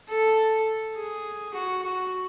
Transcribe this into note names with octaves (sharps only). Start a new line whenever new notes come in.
A4
G#4
F#4
F#4